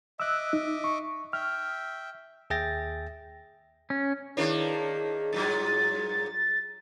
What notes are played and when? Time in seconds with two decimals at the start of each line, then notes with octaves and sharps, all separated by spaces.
0.20 D#5 E5 D6 E6 F#6
0.53 D#4
0.84 C#6
1.33 E5 G5 F6
2.50 D#2 G#4 E5 G5 A6 A#6
3.90 C#4
4.37 D#3 A#3 D4 E4 G#4 B4 C#5
5.33 G2 A#2 F#3 A6